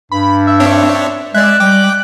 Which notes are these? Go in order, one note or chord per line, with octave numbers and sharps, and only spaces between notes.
G2 B5
E5
C4 D4 C#5
G#3 D5 E5 F#6
G3 G5 D6